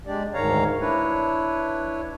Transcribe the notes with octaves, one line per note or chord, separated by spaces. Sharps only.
G#3 D4 G4 D5
D2 G#2 D#3 C#5 F5 A#5
D4 E4 B4 C#5